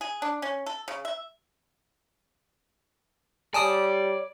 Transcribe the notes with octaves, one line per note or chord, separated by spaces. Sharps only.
G#4
D4
C#4
A4
C#3
E5
G3 C#5 D5 G#5 A5 D#6